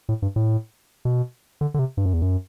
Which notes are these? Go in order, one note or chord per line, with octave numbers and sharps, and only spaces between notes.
A2
G2
A2
B2
D3
D3
C3
G2
F#2
E2
F#2